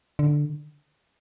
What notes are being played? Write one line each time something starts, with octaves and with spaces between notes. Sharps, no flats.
D3